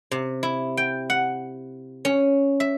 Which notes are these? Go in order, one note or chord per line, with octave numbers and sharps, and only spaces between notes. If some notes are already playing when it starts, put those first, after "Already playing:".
C3
E4
G5
F#5
C#4
E5